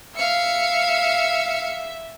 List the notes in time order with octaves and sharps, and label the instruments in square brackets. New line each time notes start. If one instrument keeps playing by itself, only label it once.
[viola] E5 [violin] F5 C#7